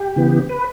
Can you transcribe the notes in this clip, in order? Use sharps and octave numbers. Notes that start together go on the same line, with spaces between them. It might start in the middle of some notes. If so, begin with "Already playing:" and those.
Already playing: G4
C#3 E3 B3
B4